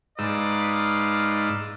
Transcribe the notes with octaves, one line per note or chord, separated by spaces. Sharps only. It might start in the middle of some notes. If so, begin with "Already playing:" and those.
G#2 D#4 B4 D5 F5 E6